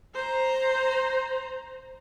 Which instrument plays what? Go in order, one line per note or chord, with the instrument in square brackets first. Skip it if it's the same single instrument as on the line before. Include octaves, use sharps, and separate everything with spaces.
[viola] C5 A#5